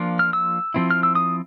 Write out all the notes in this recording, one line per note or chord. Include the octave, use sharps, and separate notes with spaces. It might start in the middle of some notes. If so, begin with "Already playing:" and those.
Already playing: F3 A#3 D4 F4
F6
E6
F3 A3 C4 E4
F6
E6
D#6